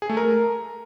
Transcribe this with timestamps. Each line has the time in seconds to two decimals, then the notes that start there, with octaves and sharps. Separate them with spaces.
0.02 G#4
0.09 A3
0.17 A#4